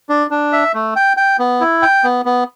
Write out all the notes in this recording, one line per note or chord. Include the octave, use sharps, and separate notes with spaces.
D4
D4
E5
A3
G5
G5
B3
E4
G5
B3
B3